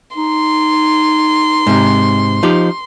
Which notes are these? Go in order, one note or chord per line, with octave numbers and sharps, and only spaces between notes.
D#4 C6
G#2 C3
F3 D#4 G4